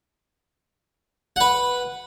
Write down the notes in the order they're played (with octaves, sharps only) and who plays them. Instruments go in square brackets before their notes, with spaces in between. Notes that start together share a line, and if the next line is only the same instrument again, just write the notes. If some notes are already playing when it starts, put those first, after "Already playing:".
[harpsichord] B4 F#5